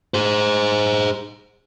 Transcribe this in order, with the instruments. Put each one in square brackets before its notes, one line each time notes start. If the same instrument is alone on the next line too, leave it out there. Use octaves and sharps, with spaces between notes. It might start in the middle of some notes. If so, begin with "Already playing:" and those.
[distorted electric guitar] G#4 C5